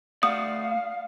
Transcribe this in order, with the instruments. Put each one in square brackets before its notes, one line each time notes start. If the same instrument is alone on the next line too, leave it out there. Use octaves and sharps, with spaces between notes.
[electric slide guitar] A3 D5 F#5 [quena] F5 [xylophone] D#6